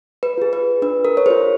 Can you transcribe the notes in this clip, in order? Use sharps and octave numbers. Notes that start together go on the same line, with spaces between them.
B4
F4 G#4
B4
D4 B4
A#4
C#5
F4 G#4 C5